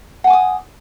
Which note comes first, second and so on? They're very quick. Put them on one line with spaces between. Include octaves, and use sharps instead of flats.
F#5 G#5 D6 D#6